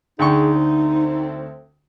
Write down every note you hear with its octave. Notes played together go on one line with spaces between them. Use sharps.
D2 D#4 G#4 G5 C#6
F#3 A3 C4